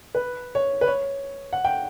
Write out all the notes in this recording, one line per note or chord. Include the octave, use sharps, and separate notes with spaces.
B4
C#5
B4
C#5
F#5
G5